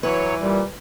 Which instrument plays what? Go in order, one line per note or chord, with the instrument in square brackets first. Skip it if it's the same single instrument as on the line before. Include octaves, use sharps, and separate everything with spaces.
[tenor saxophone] E3 [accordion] F#3 C#5 [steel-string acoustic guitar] B4
[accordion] A#2 [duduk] G3